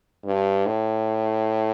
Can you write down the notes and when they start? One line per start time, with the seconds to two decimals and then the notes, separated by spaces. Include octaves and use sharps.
0.24 G2
0.66 A2